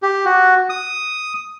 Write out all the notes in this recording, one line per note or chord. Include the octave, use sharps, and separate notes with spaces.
G4
F#4
D#6